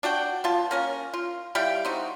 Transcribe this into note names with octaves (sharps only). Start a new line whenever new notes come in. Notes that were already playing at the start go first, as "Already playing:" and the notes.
D4 F#4 F#5 G5
B2 F4 A5
A#3 C#4 A#4
F4
G3 E4 F5 G5
C4 D#4 F#4